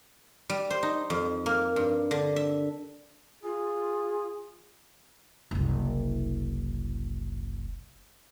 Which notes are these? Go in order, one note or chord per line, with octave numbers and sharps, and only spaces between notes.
G3
C5
D#4
F2
A#3
G2
D3
E5
F4 G#4
F#1 C2